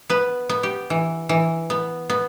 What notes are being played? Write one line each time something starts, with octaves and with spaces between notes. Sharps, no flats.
B3 B4
B3
G4
E3
E3
B3
B3